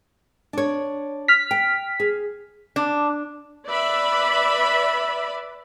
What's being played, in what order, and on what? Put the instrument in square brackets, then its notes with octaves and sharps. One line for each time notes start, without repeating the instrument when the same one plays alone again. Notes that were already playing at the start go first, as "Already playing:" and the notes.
[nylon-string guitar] D4 C#5
[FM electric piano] F6 B6
[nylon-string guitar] G5
G#4
[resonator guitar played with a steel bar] D4
[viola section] B4 D5 E5 B5